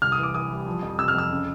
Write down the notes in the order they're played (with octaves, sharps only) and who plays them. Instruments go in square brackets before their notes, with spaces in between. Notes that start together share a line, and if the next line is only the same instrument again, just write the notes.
[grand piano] C2 F6
D#6
E3
D6
E3 D#6
G3
F3
F2
C3 E6
F6
F2 E6
C#3